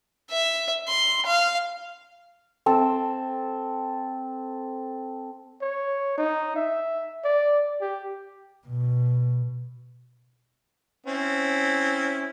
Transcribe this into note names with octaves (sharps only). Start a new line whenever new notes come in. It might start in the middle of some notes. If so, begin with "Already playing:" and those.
E5
C6
F5
C4 A4
C#5
D#4
E5
D5
G4
B2
C4 C#4 E4